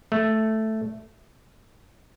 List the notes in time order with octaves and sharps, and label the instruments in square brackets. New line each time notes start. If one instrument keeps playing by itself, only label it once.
[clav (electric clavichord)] A3